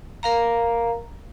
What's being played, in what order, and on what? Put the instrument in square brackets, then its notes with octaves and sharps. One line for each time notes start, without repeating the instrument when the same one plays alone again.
[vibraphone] A#4 F5 A#5